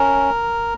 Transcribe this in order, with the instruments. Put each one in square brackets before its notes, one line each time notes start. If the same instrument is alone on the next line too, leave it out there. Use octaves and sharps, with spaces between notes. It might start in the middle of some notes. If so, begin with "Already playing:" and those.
Already playing: [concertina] C#4 A#4